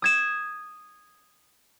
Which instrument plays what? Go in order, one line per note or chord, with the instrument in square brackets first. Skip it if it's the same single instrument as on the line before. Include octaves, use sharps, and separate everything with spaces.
[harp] D#6 G#6 E7